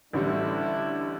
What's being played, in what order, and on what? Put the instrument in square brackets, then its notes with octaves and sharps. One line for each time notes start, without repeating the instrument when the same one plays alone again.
[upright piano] A1 D3 G3 [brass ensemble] A3 D4 E4